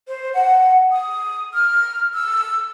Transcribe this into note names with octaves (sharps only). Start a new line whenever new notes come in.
C5
F#5
D#6
F6
E6